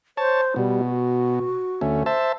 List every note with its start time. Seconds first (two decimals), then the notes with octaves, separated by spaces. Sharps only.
0.17 C5 C#5 A5
0.56 B2 G3
0.84 F#4
1.81 D2 A3 C#4
2.06 C5 E5 A5